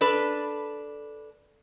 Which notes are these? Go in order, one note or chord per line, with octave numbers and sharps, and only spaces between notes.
D4 A4 B4